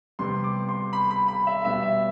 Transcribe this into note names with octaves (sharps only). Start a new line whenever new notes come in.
C3 G3 B3 C6
D6
C6
B5
B5
B5
E5
B2 G3 B3 E5
E5